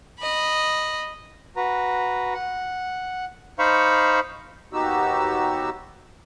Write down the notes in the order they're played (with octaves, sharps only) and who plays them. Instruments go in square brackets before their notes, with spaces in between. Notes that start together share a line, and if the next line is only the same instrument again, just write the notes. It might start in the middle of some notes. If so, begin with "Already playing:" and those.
[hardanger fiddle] D#5 B5
[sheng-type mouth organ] F#4 B4 A#5
F#5
D#4 C5 F5 B5 C#6
[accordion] D#2 B3 D#4 F#4 G4 E6